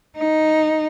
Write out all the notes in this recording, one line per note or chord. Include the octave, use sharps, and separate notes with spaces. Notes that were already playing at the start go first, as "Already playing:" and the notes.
D#4